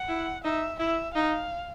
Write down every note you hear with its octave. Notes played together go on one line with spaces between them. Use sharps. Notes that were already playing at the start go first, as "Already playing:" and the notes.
Already playing: F#5
E4
D#4 E5
E4 E5
D#4 F5